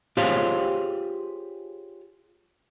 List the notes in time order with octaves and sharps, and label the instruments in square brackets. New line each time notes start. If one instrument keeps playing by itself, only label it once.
[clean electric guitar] F4 G4 G#4 C5 C#5 F5